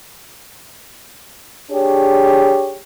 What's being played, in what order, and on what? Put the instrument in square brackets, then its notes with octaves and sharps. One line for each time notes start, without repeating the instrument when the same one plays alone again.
[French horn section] D4 G4 G#4 C#5